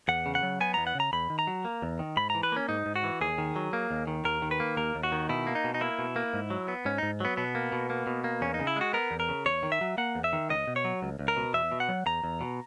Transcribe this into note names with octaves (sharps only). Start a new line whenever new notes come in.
E2 F#5
C#3
F#5
F#3
B3 G#5
E2 A#5
F#5
C#3 A#5
E2 B5
D#3
A#5
F#3
A#3
E2
D#3
G#2 B5
E3 A#5
B4
A#3 C#4
G#2 D#4
G#2
F#4
E3
D#2 G#4
D#3
F#3
A#3
D#2
D#3
D#2 A#4
D#3
B4
A#3
D#2 A#4
D#2
F#4
D#3
B2 E4
A#3
D#4
B2
D#4
A#3 E4
B2
A#3
G#2
F#3
B3
G#2 C#4
G#2 D#4
F#3 B3
B2 B3
A#3
B2
A#3
B2
A#3
E2 C#4
D#4
C#3
E4
G#3 F#4
B3 A#4
E2
A#4
C#3
E2 C#5
D#3
E5
F#3
A#3 F#5
E2
E5
D#3
C#2 D#5
B2
C#5
F#3
C#2
C#2
A#4
B2
E2 E5
B2
F#5
F#3
E2 A#5
E2
B2